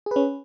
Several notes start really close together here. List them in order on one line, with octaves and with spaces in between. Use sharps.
G#4 B4 C#4